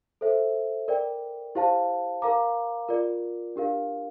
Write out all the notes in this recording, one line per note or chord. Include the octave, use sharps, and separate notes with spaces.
A4 C5 E5
A#4 D5 G5
E4 G4 C5 F5 A5
A#4 F5 A#5 D6
F4 A#4 D5
D4 G4 A#4 F5